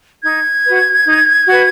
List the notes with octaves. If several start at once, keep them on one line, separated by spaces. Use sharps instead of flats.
D#4 G#6
F#4 B4
D#4
F#4 B4